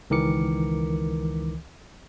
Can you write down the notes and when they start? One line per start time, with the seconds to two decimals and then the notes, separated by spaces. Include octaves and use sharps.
0.10 C#2 D#3 E3 A#4 D6 C#7